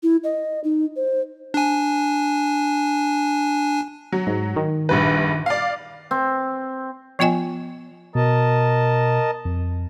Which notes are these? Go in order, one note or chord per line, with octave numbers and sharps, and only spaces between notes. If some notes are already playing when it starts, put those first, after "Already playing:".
E4
D#5
D#4
C5
D4 G#5
F#3
G#2
D#3
A#1 G2 B4
D5 F5
C4
F3 B3 F4 D#5 G5 G#5
B2 A#4 D#5 A5
F2